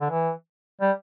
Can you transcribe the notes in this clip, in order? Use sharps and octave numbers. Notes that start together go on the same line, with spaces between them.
D3
E3
G3